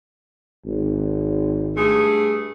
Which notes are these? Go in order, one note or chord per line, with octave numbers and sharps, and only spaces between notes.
G#1
G2 A3 G#4